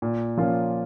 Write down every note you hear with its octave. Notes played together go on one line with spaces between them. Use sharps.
A#2
F3 A#3 C#4 F4